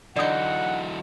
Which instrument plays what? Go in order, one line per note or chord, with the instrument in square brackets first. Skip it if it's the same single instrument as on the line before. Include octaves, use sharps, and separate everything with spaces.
[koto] D3 D#4 [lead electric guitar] E3 F#3 [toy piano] D5 D#6 [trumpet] F#5